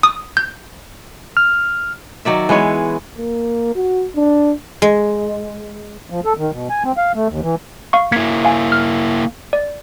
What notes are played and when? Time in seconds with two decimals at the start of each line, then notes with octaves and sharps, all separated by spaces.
0.03 D#6
0.37 G6
1.37 F6
2.25 D#3 F#3 D5 E5
2.49 E3 G#3 B3 C#5
3.18 A#3
3.75 F#4
4.16 D4
4.82 G#3
6.10 F3
6.25 A4
6.37 D#3
6.52 B2
6.70 G#5
6.84 C4
6.97 F5
7.15 A3
7.28 D#2
7.42 E3
7.93 F5 C#6
8.12 A#3 E4 G#6 B6 C#7
8.45 F5 G#5
8.72 F6
9.53 D5